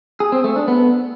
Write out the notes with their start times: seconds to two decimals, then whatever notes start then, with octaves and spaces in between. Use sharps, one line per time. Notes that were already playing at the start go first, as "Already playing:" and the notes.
0.20 G#4
0.32 C4
0.44 A3
0.56 D4
0.68 B3